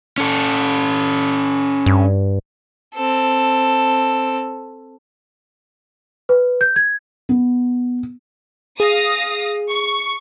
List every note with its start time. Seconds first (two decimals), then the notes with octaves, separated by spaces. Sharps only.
0.18 C#4 A4
1.86 G2
2.95 C4 A4
6.29 B4
6.61 G6
6.76 G#6
7.29 B3
8.80 G#4 F5 D#6 A#6
9.71 C#6